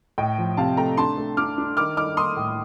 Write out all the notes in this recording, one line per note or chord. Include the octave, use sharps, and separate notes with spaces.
A2 D#5 G5
F3
C3 F5 A5
A3 G5 A#5
D4 A5 C6
A3
D4 D6 F6
D4
D#3 D6 F6
D#4 D6 F6
A#3 C6 D#6
A2